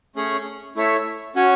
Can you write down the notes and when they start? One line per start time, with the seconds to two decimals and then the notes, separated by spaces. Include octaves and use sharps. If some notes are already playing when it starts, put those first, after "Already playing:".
0.16 A3 C#4 G#4 C#5
0.75 A3 E4 A4 C#5 E5
1.35 C#4 F#4 C#5 G#5